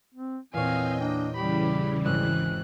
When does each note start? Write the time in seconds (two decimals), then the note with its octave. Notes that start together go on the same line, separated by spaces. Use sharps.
0.14 C4
0.53 E2 A#2 C4 C#5 D#5 F5 G5 G#5
1.01 A#3 D4
1.35 C#3 E3 G3 G4 B5
2.05 G#1 E6 F#6 E7